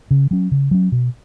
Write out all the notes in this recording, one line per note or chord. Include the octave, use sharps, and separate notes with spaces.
C#3
F#3 C#4
C#3
F#3 C#4
B2